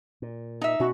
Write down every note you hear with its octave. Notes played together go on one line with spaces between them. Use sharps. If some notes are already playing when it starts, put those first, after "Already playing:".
A#2
D#4 E5
B2 C#4 F#4